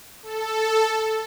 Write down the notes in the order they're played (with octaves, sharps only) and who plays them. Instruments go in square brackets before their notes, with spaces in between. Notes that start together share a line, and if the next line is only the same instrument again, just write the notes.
[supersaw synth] A4